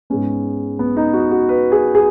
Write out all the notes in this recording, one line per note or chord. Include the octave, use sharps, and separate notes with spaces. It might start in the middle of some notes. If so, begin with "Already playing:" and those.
G#2 G#3 B3 C#4
B3
D#4
F#4
F#4
B4
G#4
G#4